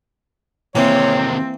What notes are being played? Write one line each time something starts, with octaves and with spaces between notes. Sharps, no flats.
C3 D#3 E3 A#3 C4 C#5